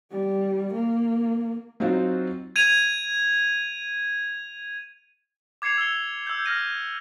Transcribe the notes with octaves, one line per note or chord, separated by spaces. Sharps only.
G3
A#3
F#3 C4 D#4 F4 F#4
G#6 D#7 F7
D6 G#6 C7 C#7 F7
E6 C7 G7
E6 G6
F6 A#6 D#7